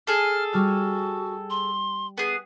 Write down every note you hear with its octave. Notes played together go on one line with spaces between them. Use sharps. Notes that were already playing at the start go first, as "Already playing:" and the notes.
G#4 A4 F6
G3 F#4 A5 F6
C6
B3 G#4